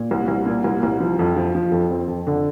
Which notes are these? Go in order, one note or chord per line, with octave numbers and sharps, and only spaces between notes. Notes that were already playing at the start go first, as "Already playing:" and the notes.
Already playing: A#2
C2
C2
A#2
C2
C2
F3
F2
F3
F3
F2
C4
F2
D3